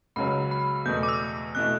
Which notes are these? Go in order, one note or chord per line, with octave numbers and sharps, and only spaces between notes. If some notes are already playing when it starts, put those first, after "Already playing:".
C#2 C#3 F#3 B5
B5
E2 B2 A3 G6
D6
E6
B2 A3 E4 F#6